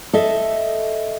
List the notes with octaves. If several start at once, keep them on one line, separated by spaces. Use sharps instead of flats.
A4 D#5 E5